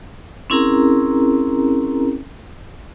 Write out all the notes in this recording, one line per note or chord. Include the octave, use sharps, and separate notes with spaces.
C4 C#4 E4 G#4 A#4 A#5